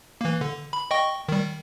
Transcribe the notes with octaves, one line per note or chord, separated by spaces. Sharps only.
E3 A#3
D3
B5
D#5 G5 C#6
D#3 G3